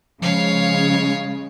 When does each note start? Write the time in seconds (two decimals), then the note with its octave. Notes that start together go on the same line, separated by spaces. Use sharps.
0.22 C#3 F3 G#3 C#5 F5